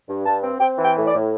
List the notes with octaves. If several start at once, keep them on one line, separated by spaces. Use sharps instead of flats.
G2
G2 A5
C4
C4 G5
E3
G5
A2
D5
A2